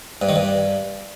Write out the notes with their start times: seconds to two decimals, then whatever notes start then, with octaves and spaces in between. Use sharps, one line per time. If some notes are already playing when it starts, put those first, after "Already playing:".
0.22 G2
0.29 D#3
0.36 G2